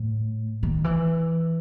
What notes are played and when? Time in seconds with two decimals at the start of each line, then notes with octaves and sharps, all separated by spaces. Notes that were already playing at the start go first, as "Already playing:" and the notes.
Already playing: A2
0.63 D#3
0.84 E3